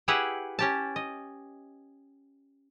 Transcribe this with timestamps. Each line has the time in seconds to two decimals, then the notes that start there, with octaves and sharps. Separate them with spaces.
0.08 E4 G4 G#4 B4 E5 F#5
0.59 C#4 G4 A5
0.96 D#5